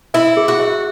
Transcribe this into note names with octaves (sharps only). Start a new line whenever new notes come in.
E4 E5
G#4
F#4
E5